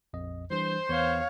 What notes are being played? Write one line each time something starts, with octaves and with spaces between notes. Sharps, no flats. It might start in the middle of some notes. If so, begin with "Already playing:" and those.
A#1 F2 D#5
E3 G3 D4 C5
E2 B3 C#5 F5